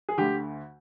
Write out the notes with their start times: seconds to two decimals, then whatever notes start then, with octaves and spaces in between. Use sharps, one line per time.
0.09 G#4
0.18 D2 D3 G4